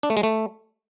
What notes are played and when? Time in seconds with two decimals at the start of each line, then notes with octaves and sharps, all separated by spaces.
0.03 D4
0.10 A3
0.17 G#3
0.23 A3